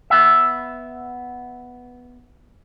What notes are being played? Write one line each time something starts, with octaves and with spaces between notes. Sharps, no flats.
B3 E5